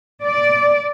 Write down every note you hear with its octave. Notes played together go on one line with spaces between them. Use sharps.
D5